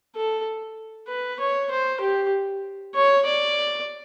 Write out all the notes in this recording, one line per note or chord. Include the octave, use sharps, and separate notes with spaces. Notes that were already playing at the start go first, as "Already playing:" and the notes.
A4
B4
C#5
C5
G4
C#5
D5